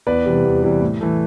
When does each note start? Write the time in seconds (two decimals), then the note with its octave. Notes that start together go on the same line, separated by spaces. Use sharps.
0.07 E2 B4 D5
0.26 C3 E3 G3
0.44 E2
0.63 C3 E3 G3
0.82 A2
1.01 E3 A3